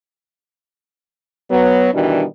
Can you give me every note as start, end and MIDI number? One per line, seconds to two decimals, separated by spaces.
1.51 1.92 54
1.51 1.92 59
1.93 2.23 47
1.93 2.23 51
1.93 2.23 52
1.93 2.23 55
1.93 2.23 62
1.93 2.23 66